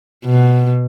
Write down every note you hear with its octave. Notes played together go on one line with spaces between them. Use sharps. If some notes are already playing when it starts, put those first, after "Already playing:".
B2